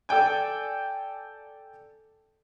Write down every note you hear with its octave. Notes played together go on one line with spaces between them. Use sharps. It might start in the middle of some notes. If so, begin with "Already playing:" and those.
A4 D5 G5 G#5